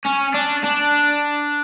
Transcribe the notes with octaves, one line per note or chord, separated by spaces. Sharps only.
C#4
D4
D4